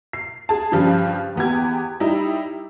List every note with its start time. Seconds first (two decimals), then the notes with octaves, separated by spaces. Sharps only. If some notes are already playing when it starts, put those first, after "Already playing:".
0.13 C7
0.49 G#4 A5
0.72 G2 C#3 F3 G3
1.36 E2 B3 G4 G#6
2.00 G3 D#4 E4